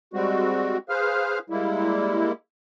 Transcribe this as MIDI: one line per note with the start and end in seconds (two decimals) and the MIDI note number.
0.14 0.78 55
0.14 0.78 56
0.14 0.78 60
0.14 0.78 66
0.89 1.39 68
0.89 1.39 71
0.89 1.39 72
0.89 1.39 77
0.89 1.39 89
1.50 2.32 55
1.50 2.32 56
1.50 2.32 58
1.50 2.32 64